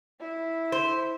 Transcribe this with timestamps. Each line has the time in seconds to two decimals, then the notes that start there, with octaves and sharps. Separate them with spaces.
0.21 E4
0.72 C5